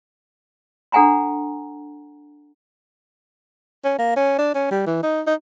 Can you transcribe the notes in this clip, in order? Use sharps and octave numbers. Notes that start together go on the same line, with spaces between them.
D4 A4 F#5 G#5 A#5 C6
C#4
A#3
C#4
D4
C#4
G3
E3
D#4
D#4